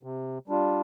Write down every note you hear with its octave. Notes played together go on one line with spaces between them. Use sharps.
C3
G3 D4 F4